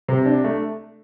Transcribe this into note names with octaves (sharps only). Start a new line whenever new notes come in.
C3
D4
A3